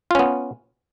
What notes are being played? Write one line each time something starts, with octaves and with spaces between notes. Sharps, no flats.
B3 C#4 F4